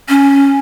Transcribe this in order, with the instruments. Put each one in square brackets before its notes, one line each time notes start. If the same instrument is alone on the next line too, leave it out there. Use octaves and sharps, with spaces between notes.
[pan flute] C#4